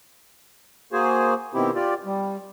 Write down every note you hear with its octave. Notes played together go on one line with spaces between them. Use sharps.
A#3 F#4 G#4 C5 G#5
B2 D#3 C4 E4 G4
F4 G4 D5
G3